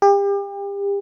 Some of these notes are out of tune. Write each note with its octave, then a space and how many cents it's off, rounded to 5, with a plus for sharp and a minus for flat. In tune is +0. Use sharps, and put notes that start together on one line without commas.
G4 +35